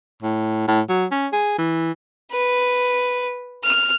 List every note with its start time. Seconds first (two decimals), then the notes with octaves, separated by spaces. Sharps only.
0.23 A2
0.68 A2
0.89 F#3
1.11 C#4
1.33 G#4
1.58 E3
2.32 B4
3.64 F6